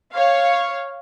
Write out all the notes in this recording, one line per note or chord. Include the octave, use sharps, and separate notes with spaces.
C#5 F5